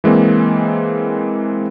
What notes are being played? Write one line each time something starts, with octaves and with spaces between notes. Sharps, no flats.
E3 G#3 A#3 C4